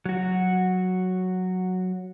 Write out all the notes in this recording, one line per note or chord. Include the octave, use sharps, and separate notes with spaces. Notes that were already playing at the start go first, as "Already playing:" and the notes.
F#3 F#4